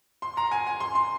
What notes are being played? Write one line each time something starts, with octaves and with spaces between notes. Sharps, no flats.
C6
A#5
G#5
G#5
C6
C6